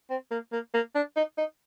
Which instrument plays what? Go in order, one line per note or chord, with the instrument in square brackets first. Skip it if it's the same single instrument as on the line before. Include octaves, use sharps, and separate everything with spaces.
[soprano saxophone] C4
A#3
A#3
A#3
D4
D#4
D#4